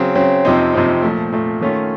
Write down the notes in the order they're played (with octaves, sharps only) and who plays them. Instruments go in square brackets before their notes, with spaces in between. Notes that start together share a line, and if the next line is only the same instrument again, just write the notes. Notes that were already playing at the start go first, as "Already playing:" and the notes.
Already playing: [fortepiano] C#3 F#3 C4
C#3 F#3 C4
F2 C3 F3 C4 D#4
F2 C3 F3 C4 D#4
A#2 F3 A3
A#2 F3 A3
D#3 A3 C#4 F4